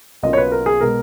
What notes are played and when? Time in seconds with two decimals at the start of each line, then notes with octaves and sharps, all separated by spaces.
0.23 B1 B2 A#3 C#4 F4 D#5
0.33 C#5
0.37 B4
0.52 A#4
0.66 G#4
0.81 B2 G#3 A#4